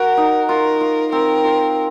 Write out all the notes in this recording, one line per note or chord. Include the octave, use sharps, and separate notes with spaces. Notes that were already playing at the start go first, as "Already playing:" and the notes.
Already playing: F#4 A#4
D#4
F4 A#4
F4
C4 A#4
F4